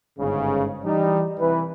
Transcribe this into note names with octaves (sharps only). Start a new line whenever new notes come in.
G1 G#2 C#3
E3 G3 D#4
C2 E3 B4